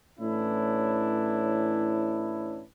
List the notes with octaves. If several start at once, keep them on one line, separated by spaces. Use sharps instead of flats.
A2 E3 C#4 D4 E4